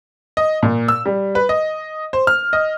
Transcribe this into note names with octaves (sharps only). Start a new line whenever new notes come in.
D#5
A#2
E6
G3
B4
D#5
C5
F6
D#5